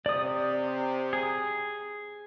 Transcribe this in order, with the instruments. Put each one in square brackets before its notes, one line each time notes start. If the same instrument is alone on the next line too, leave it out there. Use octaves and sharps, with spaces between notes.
[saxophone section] C3 [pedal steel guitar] D5 D#6
[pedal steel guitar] G#4